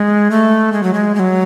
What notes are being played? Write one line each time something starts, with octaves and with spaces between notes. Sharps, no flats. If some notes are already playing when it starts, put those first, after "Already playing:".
Already playing: G#3
A3
G#3
F#3
G#3
G#3
F#3